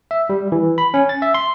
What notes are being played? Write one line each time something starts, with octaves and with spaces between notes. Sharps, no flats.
E5
G3
E3
B5
C#4
A6
E5
C6